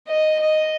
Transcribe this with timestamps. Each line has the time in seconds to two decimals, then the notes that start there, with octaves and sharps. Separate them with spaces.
0.08 D#5
0.39 D#5